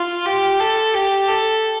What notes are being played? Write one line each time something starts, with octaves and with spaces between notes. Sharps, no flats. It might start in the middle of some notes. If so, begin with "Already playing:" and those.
Already playing: F4
G4
A4
G4
A4